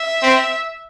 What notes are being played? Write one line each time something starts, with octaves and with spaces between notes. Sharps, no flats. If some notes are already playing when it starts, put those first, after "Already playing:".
Already playing: E5
C4